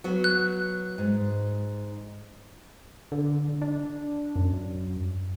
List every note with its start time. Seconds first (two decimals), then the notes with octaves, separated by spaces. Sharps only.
0.04 F#3 B3 F#4
0.24 F#6
0.98 G#2
3.12 D3
3.62 D4
4.36 F#2